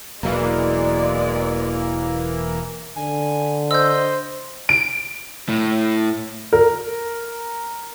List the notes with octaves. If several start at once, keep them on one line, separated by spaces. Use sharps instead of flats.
E1 E3 F#3 G#3 A#3 D5
D3 G#5
C5 D#5 E6 G6
D7
A2
A#4